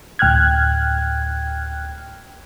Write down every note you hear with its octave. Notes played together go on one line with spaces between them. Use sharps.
D2 A2 G5 F6 F#6 G#6